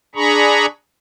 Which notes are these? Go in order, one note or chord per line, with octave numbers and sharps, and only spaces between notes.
D4 G#4 A#5 B5 C#6